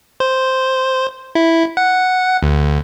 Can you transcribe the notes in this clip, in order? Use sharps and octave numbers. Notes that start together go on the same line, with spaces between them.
C5
E4
F#5
D2